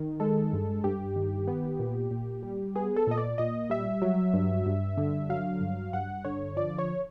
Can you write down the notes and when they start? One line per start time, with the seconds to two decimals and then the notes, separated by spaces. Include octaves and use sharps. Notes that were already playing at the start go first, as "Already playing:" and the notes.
Already playing: D#3
0.20 G#3 A4
0.53 G2
0.84 G2 G4
1.16 D#3
1.48 B3
1.79 A#2
2.11 A#2
2.43 G3
2.75 B3 G#4
2.96 A4
3.07 A#2 D#5
3.17 D5
3.38 A#2 D#5
3.70 G3 E5
4.02 F#3
4.34 G2
4.66 G2
4.97 D3
5.30 F#3 F5
5.61 G2
5.93 G2 F#5
6.25 D3 C#5
6.57 F3 D5
6.79 C#5